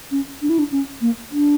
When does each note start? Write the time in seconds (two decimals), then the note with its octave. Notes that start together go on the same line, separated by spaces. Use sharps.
0.11 C#4
0.42 D4
0.49 E4
0.59 D4
0.72 C#4
1.01 A#3
1.31 D4